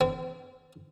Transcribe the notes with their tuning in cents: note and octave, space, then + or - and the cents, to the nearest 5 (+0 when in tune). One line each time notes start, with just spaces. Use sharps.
C4 -35